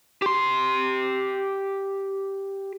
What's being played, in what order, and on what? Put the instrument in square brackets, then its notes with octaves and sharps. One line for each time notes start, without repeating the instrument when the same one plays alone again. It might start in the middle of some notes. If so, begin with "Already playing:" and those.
[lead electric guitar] G4 C6